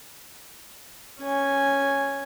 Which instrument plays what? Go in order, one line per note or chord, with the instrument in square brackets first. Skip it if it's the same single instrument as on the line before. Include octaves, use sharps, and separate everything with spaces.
[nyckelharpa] C#4 G#5